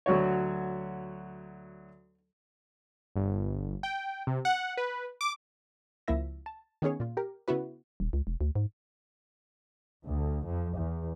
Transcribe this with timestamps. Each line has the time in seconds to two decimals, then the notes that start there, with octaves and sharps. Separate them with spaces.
0.06 D2 F#3 F#4 C#5
3.16 G1
3.83 G5
4.27 C3
4.45 F#5
4.77 B4
5.21 D6
6.08 C#2 F3 A#3 E4 E5 A#6
6.46 A5
6.82 D#3 B3 C#4 G#4 C#5
7.00 A#2 F4
7.17 G4 A#4
7.48 C#3 B3 E4 F#4 B4
8.00 D#1
8.13 C#2
8.27 E1
8.41 D2
8.55 G#2
10.05 D2
10.45 F2
10.77 E2